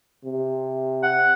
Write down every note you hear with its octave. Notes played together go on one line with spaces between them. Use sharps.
C3
F#5